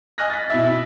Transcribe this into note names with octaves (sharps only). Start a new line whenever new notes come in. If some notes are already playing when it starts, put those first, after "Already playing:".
D#5 G#5 F6 F#6 A#6
A6 B6
B2 E4 E5